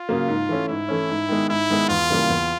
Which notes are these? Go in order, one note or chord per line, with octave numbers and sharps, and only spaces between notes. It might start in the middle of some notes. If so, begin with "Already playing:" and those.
Already playing: F4
C#3 F#3 A#3
G#2
E3 A3 C#4
G#2 E4
E3 A3 C#4
G#2
D#3 G#3 B3
G#2 E4
D#3 G#3 B3
E2 F4
C#3 E3 G3 A#3
E2